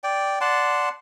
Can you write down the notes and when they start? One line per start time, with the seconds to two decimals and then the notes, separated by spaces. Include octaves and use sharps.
0.04 D5 G5
0.41 D5 F#5 A5 C6